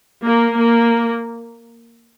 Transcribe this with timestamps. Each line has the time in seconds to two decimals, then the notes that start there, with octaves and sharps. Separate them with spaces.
0.23 A#3
0.54 A#3